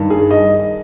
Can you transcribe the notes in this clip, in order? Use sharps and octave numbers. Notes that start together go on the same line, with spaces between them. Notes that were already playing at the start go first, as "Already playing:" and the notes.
Already playing: G2 D#3
G#4
D#5